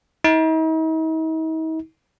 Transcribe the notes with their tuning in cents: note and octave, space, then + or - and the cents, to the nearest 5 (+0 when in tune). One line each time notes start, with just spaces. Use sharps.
D#4 +45